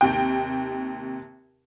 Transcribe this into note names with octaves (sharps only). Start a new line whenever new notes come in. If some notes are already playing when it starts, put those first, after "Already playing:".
D#2 C3 G5